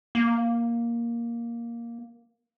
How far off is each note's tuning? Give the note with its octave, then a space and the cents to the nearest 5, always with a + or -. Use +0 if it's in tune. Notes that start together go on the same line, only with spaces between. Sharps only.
A#3 +5